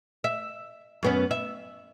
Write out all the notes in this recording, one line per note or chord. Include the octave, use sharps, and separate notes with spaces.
E5
F#2 B3 C#4
E5